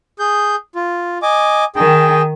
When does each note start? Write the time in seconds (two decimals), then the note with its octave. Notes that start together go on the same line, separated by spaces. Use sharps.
0.19 G#4 G6
0.75 F4
1.22 D#5 G#5 D6
1.76 D#3 G#4 G5